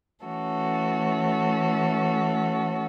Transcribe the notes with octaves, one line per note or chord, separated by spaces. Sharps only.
E3 A3 C#4 F#4 A4